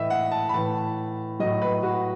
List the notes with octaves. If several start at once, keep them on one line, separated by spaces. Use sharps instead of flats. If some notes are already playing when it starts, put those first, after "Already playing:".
Already playing: A2 E3 D#5 E5
F#5
A5
B5
A2 E3 A5
A2 F#3 D#5
B4
F#4